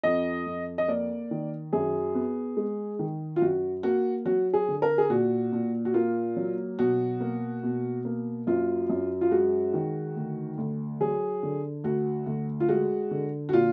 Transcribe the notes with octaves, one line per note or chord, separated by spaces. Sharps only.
F2 D#5
F2
D#5
A#3 D5
D#3
F#2 G#4
B3
G#3
D#3
F4
F#2 F#4
A#3 F#4
F#3 F#4
G#4
D3
A#4
G#4
A#2 F#4
A#2
F#4
A#3 F4
F#3
B2 F#4
A#3
B2
A#3
F#2 F4
F#2
F4
G#3 F#4
D#3
D2
D2
F#3 G#4
D3
D2 F#4
D2
F4
G#3 F#4
D3
F#4
A#2 F4